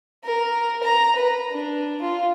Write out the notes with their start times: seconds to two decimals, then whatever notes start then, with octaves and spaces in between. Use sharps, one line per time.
0.25 A#4
0.83 A#5
1.16 B4
1.51 D4
2.02 F4